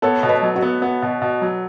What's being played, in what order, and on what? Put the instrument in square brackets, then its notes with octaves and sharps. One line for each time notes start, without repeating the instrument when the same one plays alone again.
[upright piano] B3 [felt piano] A4 C#5
[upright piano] B2
[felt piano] B4 D#5
[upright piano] F#3
[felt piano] F#4
[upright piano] B3
B3
B2
B2
F#3